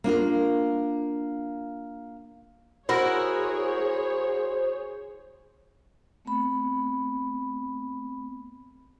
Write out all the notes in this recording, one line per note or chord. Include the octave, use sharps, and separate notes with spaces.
A#3 D4 F4 A#4
E4 F#4 G#4 A#4 C5 C#5
A3 B3 C4 B5